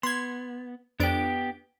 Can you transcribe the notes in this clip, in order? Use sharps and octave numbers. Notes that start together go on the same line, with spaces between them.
B3 C6 G#6
F2 B3 D4 G4 D7